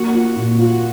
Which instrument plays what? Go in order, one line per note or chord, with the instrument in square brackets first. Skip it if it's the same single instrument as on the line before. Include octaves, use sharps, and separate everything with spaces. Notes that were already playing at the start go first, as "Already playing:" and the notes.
Already playing: [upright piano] A#3 [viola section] F#4
[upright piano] F4
A#2
[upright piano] F4 [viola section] F#4